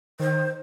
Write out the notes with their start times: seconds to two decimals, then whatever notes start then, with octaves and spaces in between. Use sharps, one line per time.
0.20 D#3 C5